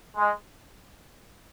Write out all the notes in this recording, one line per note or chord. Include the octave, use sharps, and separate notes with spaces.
G#3